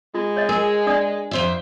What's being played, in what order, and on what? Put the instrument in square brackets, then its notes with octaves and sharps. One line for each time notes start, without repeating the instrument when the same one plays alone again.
[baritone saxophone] G#3 [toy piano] F4
[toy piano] C#5 D#5
[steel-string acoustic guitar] G#4 [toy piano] A#4
[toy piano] D4 D5 D#6
[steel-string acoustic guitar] F2 C5 E5